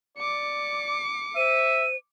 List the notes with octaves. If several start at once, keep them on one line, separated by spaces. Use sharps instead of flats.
D5 D6 C#7
C5 E5 D#7